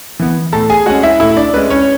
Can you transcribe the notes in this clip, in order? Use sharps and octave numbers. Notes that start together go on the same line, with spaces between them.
E3 B3
A2 A4 A5
G#4 G#5
G#3 C#4 F#4 F#5
E4 E5
A2 E4 E5
D4 D5
G#3 C#4 B4
C#4 C#5